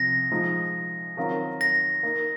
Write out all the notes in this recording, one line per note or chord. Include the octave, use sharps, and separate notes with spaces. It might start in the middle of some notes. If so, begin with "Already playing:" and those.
Already playing: C3 F3 C4 A#6
F3 G#3 D#4
D#3 F#3 C4 F4 A#4
A#6
A#3 D#4 A#4